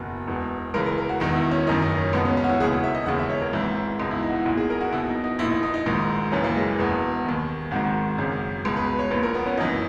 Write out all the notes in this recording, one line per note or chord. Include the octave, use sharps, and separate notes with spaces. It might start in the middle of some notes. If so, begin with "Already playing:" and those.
Already playing: F#1 E2 B2
E1 E2 B2
C#2 C#3 E3 A#4
A#4
A#4
F#4
E1 E2 D#3 F#4
E4
C#4
F#1 F#2 D#3 D#4
D#4
C#4
C#2 B2 B3
C#4
C#4
F#4
E4
E1 D#2 C#3 E3 G#4
F#5
E5
D#5
E1 D#2 C#3 E3 F#5
E5
C#5
A#4
G#1 G#2 E3 E4
C#2 B2 D#4
E4
D#4
F#4
E4
B1 A#2 F#4
G#4
A#4
F#4
B1 B2 E4
D#4
D#4
A#1 A#2 E4
D#4
D#4
D#4
A#1 G#2 D#3
F#1 F#2 E3 C#4
A#3
G#3
E1 E2 B2 B3
D#2 D#3
G#1 G#2 D#3 F#4
G#1 F#2 C#3
C#2 B2 G#4
B4
B4
C#5
A#1 A#2 B4
A#4
B3
C#4
G#1 F#2 E3 D#4